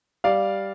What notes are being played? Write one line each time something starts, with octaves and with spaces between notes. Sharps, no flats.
G3 D5 F5